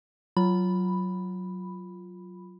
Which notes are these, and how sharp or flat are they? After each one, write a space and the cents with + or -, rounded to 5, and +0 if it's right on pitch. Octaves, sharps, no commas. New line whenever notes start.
F#3 +0 F4 +0 B5 +0